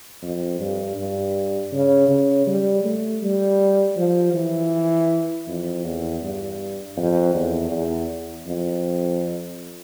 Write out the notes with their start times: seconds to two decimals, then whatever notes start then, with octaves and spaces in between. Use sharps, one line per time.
0.22 F2
0.60 G2
0.97 G2
1.72 C#3
2.09 C#3
2.47 G3
2.84 A3
3.23 G3
3.96 F3
4.34 E3
5.47 F2
5.84 E2
6.22 G2
6.97 F2
7.35 E2
7.71 E2
8.47 F2